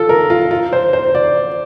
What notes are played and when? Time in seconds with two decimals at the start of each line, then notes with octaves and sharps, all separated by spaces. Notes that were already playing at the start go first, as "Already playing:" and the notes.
Already playing: F4 A4
0.09 A#4
0.30 F4
0.51 F4
0.73 C5
0.93 C5
1.15 D5